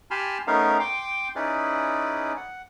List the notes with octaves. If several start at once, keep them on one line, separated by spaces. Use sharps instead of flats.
G4 G#5 A5 B5 C6 F6
A3 B3 C#4 D#4 A#4 F5
G5 C6 D6
C#4 D#4 E4 G#4 B4 D5
F#5